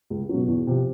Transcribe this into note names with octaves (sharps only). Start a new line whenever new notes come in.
C#2
B2 F#3
E2
C3 F3